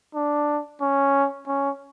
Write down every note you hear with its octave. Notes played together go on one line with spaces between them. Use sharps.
D4
C#4
C#4